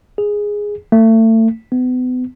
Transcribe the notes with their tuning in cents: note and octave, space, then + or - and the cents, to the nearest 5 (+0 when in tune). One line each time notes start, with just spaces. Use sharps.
G#4 -5
A3 +30
B3 +35